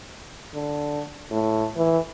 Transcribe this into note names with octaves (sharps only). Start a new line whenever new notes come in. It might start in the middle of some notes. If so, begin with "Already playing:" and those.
D3
A2
E3